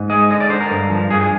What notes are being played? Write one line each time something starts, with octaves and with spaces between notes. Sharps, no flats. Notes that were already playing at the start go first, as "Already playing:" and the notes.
Already playing: G#2
G#3 D#5
D3 D#5
D5
D3 C5
A#4
G2
F3
G2 G#4
G#4